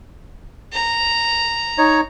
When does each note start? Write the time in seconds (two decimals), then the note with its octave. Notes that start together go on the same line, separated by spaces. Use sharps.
0.73 A#5
1.78 D#4 C#5